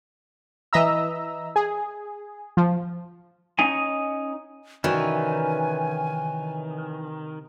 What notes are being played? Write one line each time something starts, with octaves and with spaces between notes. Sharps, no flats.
E3 D#5 E5 A#5 E6
G#4
F3
C#4 D#4 G#5
C3 D#3 E3 C#4 F#4 D5 G#5